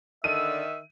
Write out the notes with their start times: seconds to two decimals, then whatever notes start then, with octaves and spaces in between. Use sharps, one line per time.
0.24 D3 D#3 D5 E5 E6 D#7